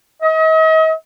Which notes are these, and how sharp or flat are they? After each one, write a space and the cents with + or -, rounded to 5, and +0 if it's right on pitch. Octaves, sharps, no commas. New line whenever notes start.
D#5 +40